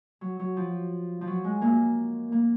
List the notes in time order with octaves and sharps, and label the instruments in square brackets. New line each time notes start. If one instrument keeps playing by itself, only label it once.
[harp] F#3
F#3
F3
F3
F#3
G#3
A#3
A#3